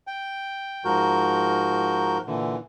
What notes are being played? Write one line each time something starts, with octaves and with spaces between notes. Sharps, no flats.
G5
G#2 F3 F#4 A#4 G6
A#2 D3 E3